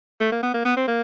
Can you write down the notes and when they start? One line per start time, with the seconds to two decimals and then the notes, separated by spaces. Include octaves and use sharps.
0.20 A3
0.32 A#3
0.43 B3
0.54 A#3
0.65 B3
0.77 C4
0.87 A#3